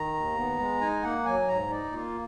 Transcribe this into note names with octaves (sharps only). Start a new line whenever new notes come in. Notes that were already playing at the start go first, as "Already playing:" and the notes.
Already playing: D#3 A#5
D#2
B3
G#3
D#4 G#5
A#3 F#5
F#3 G#5
G#2 A#5
D#4 D5
A#3 F4